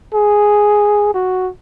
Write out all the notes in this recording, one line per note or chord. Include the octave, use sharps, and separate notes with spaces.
G#4
F#4